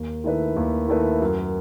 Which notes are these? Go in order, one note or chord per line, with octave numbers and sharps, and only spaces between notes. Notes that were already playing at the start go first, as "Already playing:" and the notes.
Already playing: D#2
D#3 A3 E4 B4
D#2
D#3 A3 E4 B4
F#2